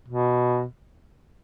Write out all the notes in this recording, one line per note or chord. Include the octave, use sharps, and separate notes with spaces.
B2